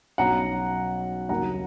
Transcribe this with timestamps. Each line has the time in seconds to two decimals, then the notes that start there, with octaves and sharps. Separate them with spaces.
0.18 B1 B2 F#3 C#4 F#5 A#5
1.29 D#2 C#3 F#3 A#3 F#5 A#5